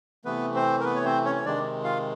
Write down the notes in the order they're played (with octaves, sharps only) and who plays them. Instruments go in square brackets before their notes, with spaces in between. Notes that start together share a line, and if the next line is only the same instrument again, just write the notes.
[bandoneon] C3 E3 A3 B3 B4
C4 C5
A#4
B3 B4
C#5
C4 C5
C#4 C#5
C#5
C3 D#3 G#3 D4 D5
F4 F5